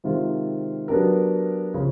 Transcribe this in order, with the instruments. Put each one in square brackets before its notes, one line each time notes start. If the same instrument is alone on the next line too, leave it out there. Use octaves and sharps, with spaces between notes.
[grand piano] C3 D#3 G#3 C4 F4
F#3 B3 D4 G4 A#4
C#3 F3